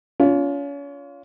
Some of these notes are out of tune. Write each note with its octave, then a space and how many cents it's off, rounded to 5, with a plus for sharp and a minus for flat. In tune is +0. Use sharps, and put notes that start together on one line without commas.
C#4 +35 F4 +0